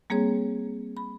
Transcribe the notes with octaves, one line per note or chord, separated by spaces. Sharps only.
G3 A#3 C4 G#4 C#5
B5